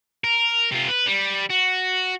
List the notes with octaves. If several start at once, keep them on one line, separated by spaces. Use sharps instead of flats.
A#4
C3 F4
B4
G3
F#4